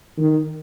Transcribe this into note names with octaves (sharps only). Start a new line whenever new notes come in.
D#3